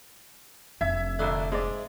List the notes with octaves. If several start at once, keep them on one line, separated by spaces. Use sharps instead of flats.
F1 D4 E5 G#6
A#1 D3 C6 E6 F#6
G#2 G#3 D5